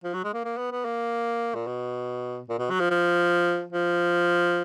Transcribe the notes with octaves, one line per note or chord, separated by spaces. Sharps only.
F3
F#3
G#3
A#3
A#3
B3
B3
A#3
A#2
B2
A#2
B2
F#3
F3
F3
F3